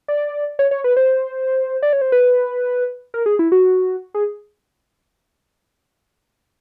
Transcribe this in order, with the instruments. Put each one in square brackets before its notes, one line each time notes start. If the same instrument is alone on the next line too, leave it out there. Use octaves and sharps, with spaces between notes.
[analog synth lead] D5
C#5
C#5
B4
C5
D5
C#5
C5
B4
A#4
G#4
E4
F#4
G#4